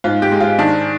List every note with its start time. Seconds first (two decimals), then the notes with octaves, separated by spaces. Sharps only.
0.04 G#2 F4
0.22 G4
0.32 G#3
0.40 F4
0.59 D#3 D4